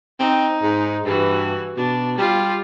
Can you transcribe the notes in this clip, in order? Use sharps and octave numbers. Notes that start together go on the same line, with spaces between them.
C4 D#4
G#2
G2 E3 F#4
B2 D4
G3 F4 G4